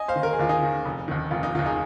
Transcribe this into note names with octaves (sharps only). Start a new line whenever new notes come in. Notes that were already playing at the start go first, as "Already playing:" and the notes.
Already playing: D#5 G#5
C5 F5
D#3
A#4
G#4
D#2 F4
D#4 G#4
D#3
F1
D#2 D#3
F1 F4
D#4
D#2 D#3 F4
D#4 G#4